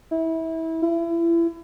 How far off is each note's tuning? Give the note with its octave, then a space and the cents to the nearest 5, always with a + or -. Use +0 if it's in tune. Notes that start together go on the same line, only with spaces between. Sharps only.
E4 -25
E4 +30